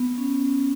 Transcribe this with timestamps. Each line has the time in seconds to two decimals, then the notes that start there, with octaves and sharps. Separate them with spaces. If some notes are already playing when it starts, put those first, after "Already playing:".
Already playing: B3
0.18 C#4